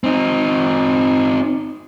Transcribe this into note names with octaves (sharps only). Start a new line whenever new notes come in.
C4 D#4